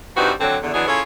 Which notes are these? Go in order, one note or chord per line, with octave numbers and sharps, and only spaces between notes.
G2 E3 G3 C4 D#4 F#4
D3 F#3 C4
E2 D3
E3 F#3 G#3 B3 D4 G#4
C#4 E4 F4 G#4 A4 C#5